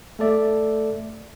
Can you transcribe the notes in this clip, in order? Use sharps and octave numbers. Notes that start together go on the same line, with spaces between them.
A3 A4 D5 E5